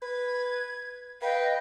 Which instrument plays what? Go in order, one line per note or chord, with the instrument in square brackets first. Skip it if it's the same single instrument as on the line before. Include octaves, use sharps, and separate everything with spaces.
[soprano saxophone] B4 [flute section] G#6
[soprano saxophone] B4 [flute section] D#5 G5 [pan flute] F5